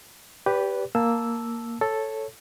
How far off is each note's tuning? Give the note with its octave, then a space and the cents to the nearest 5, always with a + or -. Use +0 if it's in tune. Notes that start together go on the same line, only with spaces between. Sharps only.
G4 +0 B4 +0 D5 -40
A#3 +0 A5 +0 E6 +0
A4 +0 C#5 -5